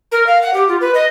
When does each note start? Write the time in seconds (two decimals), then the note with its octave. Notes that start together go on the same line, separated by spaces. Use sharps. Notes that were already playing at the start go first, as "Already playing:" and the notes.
0.12 A#4
0.27 F5
0.43 F#5
0.54 G4
0.68 F4
0.81 B4
0.94 D#5